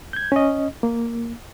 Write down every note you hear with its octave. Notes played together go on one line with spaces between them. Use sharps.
G6 G#6
C#4 D#5
A#3